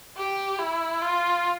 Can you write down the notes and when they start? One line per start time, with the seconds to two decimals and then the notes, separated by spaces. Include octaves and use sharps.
0.18 G4
0.59 E4
1.01 F4